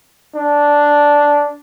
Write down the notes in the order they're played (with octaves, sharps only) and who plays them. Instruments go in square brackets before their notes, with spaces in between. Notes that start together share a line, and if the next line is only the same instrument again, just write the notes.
[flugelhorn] D4